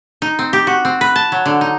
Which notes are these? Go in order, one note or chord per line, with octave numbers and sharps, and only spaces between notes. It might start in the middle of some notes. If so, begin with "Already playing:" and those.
D#4
C4
G4
F#4
C4
B4
A5
F#3
D3
D#4